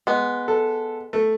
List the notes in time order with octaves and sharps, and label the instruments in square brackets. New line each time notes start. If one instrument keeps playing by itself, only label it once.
[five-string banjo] G#3 B3
[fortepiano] A4
A3